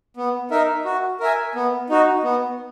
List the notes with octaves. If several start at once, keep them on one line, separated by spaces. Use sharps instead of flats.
B3
D#4 A#4 E5
F#4
A#4 E5 G#5
B3
D#4 F#4
B3